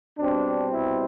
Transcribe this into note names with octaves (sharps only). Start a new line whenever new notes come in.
B2 G3 C4 D4
E4